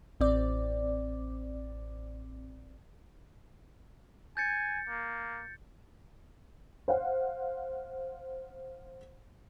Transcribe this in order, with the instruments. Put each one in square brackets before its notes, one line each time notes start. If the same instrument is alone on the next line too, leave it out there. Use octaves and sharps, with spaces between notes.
[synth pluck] A1 C4 D5
[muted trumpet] G#5 [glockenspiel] G6 A6 C#7
[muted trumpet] A#3
[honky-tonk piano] C5 F5 F#5